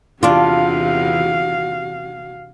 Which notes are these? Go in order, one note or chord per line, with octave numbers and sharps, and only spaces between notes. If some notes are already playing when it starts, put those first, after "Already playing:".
E2 C3 D4 F4 F#4 D5 F5